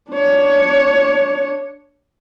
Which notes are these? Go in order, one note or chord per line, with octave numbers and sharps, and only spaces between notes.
D4 C#5